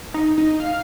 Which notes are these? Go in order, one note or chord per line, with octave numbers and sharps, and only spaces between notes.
D#4
D#4
F5